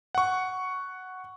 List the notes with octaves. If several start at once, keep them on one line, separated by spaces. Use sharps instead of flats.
F#5 C#6